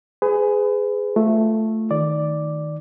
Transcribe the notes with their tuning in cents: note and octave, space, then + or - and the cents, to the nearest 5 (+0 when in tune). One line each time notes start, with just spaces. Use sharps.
G#4 +0 B4 +35
A3 +0 F4 +0
D#3 +0 D5 +0